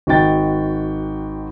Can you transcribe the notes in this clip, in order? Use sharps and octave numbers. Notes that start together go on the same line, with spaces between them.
G#1 F#4 D#5 G5 A6